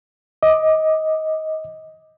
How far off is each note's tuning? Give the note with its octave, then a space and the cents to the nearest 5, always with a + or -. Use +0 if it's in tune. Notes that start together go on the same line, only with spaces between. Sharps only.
D#5 +20 D6 +15